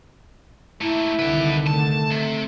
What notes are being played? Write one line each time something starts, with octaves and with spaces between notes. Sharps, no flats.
A3 A#3 E4
C2 D3 D#3 B4 G5
A3 A5
C3